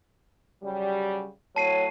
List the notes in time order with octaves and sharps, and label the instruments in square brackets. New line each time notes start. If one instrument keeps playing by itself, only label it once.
[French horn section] C#3 F#3 G3
[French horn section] A2 F#3 C#5 [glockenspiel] A5 C7 D#7